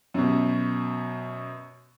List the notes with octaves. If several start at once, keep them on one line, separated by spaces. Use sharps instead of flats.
F#2 B2